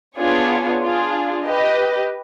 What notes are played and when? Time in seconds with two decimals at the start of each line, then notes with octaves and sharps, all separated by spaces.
0.17 B3 D4 F4 G#4 C#5
0.81 D4 F4 G#4
1.45 G4 B4 D#5